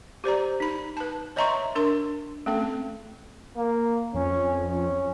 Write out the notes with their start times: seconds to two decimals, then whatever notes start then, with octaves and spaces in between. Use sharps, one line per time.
0.24 G4 C5 D5 A#5
0.60 D#4 B5
0.97 B4 A5
1.36 C#5 D#5 E5 A#5 C6 C#6
1.75 D4 A#4 C6
2.46 A3 C4 C#4 A4
3.56 A#3
4.14 F2 C#4
4.69 C#4